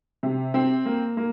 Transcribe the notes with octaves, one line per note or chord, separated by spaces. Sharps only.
C3
C4
A#3
A#3